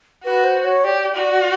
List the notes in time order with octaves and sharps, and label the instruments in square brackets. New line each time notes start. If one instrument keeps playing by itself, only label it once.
[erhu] F#4 [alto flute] B4
[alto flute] C5
C#5
[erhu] G4 [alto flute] D5
[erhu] F#4 [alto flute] D5